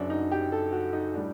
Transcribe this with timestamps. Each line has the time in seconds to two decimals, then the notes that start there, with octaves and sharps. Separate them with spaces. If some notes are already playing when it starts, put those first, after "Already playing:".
Already playing: F#1 F#2 F#3 D4
0.10 D#4
0.32 G4
0.52 A4
0.73 F#4
0.93 D#4
1.14 A2 G3 D4